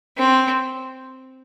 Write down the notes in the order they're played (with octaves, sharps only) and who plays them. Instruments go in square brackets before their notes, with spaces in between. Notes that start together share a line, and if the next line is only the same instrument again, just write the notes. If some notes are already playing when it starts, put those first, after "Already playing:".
[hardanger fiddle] C4